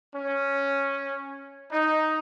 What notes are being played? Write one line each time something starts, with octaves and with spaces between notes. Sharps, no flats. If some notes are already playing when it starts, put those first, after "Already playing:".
C#4
D#4